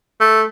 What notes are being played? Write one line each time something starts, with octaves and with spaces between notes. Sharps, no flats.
A3